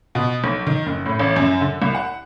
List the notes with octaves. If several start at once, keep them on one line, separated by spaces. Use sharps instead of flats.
B2
B1
D#3
F#1
A2
A1
F#2
D3
C2
F#5